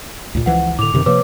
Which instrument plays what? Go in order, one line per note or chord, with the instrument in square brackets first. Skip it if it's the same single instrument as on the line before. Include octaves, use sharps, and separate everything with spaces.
[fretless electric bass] D2 A#2
[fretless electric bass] C#2 E3 F3 [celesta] F#5
[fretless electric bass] A2 D3 [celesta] D6 F7
[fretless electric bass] F#2 C3 D#3
[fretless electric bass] C3 F3 A#3 [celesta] B4 C#5 D6